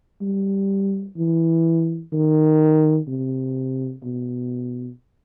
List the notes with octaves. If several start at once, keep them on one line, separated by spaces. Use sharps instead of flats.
G3
E3
D#3
C3
B2